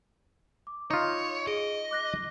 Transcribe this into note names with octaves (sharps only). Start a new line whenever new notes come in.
D6
D#4 F4 C#5
G#4 D#5 D7
D6 F#6 A#6